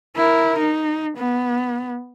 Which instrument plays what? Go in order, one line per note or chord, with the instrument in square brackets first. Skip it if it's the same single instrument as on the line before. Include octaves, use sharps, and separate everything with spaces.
[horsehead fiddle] E4 A#4
D#4
B3